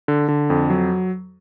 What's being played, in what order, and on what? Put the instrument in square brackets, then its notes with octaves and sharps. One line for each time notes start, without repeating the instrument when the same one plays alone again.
[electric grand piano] D3
D3
F2
F#3